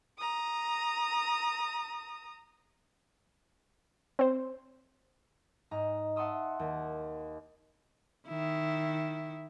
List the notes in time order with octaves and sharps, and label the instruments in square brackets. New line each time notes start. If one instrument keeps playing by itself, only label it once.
[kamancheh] A#5 D#6
[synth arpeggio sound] C4 C5
[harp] G#2 D#4 D#5 A#5
E5 F#5 A5 C6 D#6 E6
D#2
[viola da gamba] D#3 E4